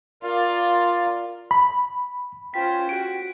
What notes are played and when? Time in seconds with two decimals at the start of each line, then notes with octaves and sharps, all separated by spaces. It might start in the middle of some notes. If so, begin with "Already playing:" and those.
0.23 F4 A#4 D5 F5
1.51 B5
2.54 C#4 F4 C5 G5 B6
2.89 F#4 D7